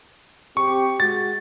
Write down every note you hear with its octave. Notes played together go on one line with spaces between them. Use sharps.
C4 G4 C#6
G#3 F#4 A6